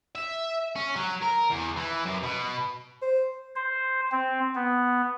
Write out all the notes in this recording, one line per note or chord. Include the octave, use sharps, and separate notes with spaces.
E5
C#4
F#3
A#4
E2
E3
F#2
B2
C5
C5
C4
B3